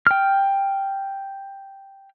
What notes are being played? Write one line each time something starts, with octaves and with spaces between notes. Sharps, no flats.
G5 F6